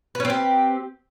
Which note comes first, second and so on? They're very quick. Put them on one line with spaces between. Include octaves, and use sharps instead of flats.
B4 C#4 C4 G4